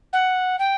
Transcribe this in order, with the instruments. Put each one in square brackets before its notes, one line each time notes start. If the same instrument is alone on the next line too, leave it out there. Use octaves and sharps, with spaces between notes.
[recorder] F#5
G5